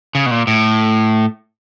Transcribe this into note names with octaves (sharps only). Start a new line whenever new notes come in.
C#3
B2
A#2
A2